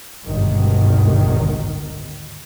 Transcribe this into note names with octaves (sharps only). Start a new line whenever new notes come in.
G#1 D2 G2 B2 D#3